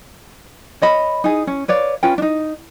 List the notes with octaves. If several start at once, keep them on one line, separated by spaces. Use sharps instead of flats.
C#5 D#5 B5
D#4 G#4
C#4
B4 C#5 D5 F5
C#4 F4 B4 G5
D4 D#4